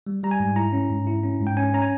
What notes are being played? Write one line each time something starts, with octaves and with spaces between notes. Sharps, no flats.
G3
G3 A#5
G#5
G#2
E4 A#5
C#4
G#2
E4
C#4
G#2
G5
C#4 G#5
C#4 A#5
G#5